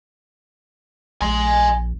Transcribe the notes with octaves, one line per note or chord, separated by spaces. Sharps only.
A#1 G#5 C6